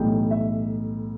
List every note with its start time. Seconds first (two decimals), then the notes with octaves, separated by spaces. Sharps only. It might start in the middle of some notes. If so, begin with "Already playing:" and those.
Already playing: B1 A2 E3 G3 G5
0.31 E5